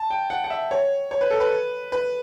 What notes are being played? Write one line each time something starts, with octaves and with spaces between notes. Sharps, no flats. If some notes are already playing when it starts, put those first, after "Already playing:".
Already playing: A5
G5
F#5
F#5
E5
C#5
C#5
B4
A4
B4
B4